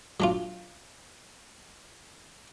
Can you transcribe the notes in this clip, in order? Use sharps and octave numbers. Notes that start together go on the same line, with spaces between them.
F#3 D4 F4